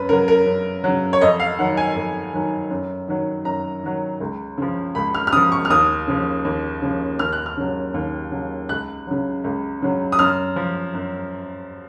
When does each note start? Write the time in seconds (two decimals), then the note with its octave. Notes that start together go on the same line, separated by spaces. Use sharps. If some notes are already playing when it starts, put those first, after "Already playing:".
Already playing: F#2 B4
0.09 C#3 F#3 A#4
0.28 A#4
0.46 F#2
0.84 C#3 F#3
1.13 C#5
1.21 F2 D#5
1.40 F5
1.58 D#3 F#3 F#5
1.77 G#5
1.96 F2
2.33 D#3 F#3
2.71 F#2
3.08 D#3 F#3
3.45 F#2 A#5
3.83 D#3 F#3
4.20 C#2
4.58 C#3 F3
4.95 C#2 B5
5.14 F6
5.27 F6
5.32 C#3 D#6
5.36 F3
5.52 C#6
5.65 F6
5.70 D#2 D#6
6.08 C#3 F3
6.45 D#2
6.82 C#3 F3
7.19 D#2 F6
7.33 F#6
7.46 F6
7.57 C#3 F#3
7.94 D#2
8.31 C#3 F#3
8.69 C#2 F#6
9.07 C#3 F#3
9.44 C#2
9.82 C#3 F#3
10.12 D#6
10.19 F#2 F6
10.56 F3
10.94 F#2